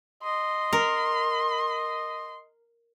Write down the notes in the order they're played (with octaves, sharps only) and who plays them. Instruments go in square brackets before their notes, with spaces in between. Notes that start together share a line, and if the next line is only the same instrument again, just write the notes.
[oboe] D#5 [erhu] C6
[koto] A#4